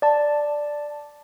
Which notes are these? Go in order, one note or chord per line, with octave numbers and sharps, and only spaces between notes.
D5 A5